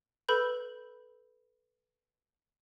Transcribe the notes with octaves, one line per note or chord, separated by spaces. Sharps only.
A4 B4 B5 G6